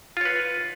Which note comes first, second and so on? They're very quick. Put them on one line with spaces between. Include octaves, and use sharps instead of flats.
F4 C#5 B4